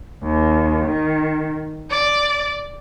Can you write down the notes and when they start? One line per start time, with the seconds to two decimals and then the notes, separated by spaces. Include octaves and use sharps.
0.23 D#2
0.87 D#3
1.90 D5